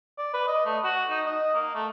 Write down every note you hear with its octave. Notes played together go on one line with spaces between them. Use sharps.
D5
B4
D#5
A3
F#4
D#4
D#5
A#3
A3